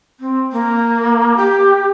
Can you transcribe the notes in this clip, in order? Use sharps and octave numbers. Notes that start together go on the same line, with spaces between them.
C4
A#3
G4